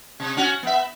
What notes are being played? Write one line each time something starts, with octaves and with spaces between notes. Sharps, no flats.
C3
C#4 F#4
B3 E5